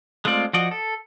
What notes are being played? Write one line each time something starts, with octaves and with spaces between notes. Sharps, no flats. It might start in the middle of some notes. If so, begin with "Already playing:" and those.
G#3 A3 C4 F4 D5
F3 F#4 D5 D#5
A4